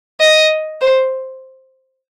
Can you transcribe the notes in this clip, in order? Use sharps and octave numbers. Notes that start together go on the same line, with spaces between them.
D#5
C5